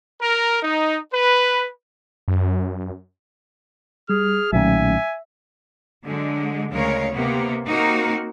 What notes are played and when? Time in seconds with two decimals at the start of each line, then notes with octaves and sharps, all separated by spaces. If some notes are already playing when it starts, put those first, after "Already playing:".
0.21 A#4
0.62 D#4
1.13 B4
2.28 F#2
4.09 G3 G#4 F6
4.53 B1 A#2 D#3 F#3 A3 C#4 E5 G#5
6.04 D3 F#3 G#3
6.71 D2 C#3 G#3 A#4 C#5 F5
7.12 C3 A#3 B3
7.65 A#3 C4 D#4 F#4 A#4